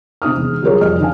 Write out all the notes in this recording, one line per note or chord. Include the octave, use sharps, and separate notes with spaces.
C3 D#4 D#6 F6
E1
F#3 G3 F4 G#4 A#4 C#5
F1 G3 D#5 F6
D#3 D4 F5 G#5